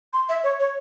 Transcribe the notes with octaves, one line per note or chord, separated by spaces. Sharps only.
C6
E5
C#5
C#5